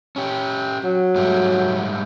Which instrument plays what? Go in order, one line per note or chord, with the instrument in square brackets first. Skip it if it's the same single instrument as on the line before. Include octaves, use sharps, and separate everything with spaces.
[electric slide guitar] C#4 G4
[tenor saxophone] F#3
[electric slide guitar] G#2 G3 A3